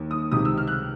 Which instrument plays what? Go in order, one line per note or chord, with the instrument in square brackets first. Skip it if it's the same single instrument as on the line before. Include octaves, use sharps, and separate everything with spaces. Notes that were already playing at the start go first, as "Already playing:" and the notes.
Already playing: [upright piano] D#2
D#6
C#2 C3 D#3 D#6
E6
F6
F#6
F6